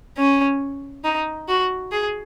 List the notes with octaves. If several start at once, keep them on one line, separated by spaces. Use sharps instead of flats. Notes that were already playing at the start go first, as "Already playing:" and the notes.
C#4
D#4
F#4
G#4